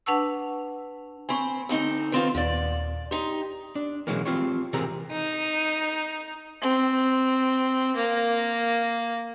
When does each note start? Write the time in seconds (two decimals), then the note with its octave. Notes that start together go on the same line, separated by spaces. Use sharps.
0.06 D4 B4 F#5 A5 C#6 E6
1.29 C4 C5 G#5 B5 C#6
1.69 D2 C4 D#4
2.12 D#3 C4 F4 B4
2.35 D#2 A#2 D5
3.11 D#4 G4 C6
3.75 D4
4.07 B2 E3 F#3 G#3 A#3
4.25 C4 F4 G4 C#5
4.73 C3 E3 C4 G#4 A#4 A#5
5.11 D#4
6.62 C4
7.96 A#3